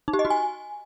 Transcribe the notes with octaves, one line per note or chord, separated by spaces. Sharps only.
D#4
G4
D#5
F#4
G#5